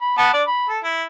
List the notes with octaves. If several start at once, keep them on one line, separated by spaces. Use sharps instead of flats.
B5
B3 F#5 A5
D4 D5
B5
A4
E4